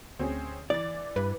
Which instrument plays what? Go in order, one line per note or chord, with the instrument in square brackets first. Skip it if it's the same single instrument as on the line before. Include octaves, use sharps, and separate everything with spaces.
[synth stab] D2 [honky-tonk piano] C4 C#4 G#4
[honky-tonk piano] E3 D6 A6 [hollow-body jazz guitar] D5
[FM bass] G2 [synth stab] B4